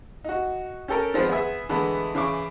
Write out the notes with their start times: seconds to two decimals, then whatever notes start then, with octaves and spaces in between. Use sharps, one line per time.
0.24 D#4 F#4
0.88 C#4 G4 A4 A#4
1.14 D#3 F3 G#3 B3 C4
1.29 B3 G#4 E5
1.69 D3 E3 G#3 A3 B3
2.15 C#3 E3 C#6 D6